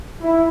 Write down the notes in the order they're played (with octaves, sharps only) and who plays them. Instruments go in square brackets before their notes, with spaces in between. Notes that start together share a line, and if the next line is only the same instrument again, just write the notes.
[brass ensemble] E4